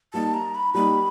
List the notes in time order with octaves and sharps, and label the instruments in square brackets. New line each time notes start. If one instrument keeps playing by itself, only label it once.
[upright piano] G3 A#3 D#4 [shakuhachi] A5
[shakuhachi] A#5
B5
[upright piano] G3 A#3 D#4 [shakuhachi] B5